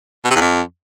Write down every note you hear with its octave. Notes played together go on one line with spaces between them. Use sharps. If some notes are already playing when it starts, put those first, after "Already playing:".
B2
C3
E2
F2